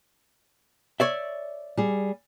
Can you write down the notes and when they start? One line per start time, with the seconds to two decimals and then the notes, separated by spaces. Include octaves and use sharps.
1.00 C#5 D5 E5
1.77 G3 G#4